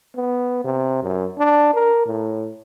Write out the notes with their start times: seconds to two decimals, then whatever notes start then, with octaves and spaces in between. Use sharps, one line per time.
0.17 B3
0.64 C3
1.03 F#2
1.38 D4
1.74 A#4
2.06 A2